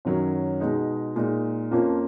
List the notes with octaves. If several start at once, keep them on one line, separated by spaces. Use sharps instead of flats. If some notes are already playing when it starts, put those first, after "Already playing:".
F#2 D#3 F#3 C#4
B2 G#3 D#4
A#2 G#3 D#4
F2 F3 A#3 C#4 F4